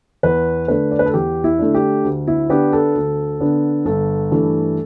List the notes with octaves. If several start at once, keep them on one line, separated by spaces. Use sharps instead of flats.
E2 B4
D3 A3 D4 B4
D5
B4
A4
E2 G4
E4
D3 A3 D4
G4
D2
E4
D3 B3 D4 G4
A4
D2
D3 B3 D4
G1 A4
G2 E3 A3